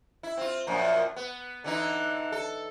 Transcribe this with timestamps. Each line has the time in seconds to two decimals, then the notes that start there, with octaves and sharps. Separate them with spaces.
0.23 E4
0.37 C4 F4
0.67 F#2 A#2 F3
1.16 B3
1.64 D3 E3 D#4
2.32 A4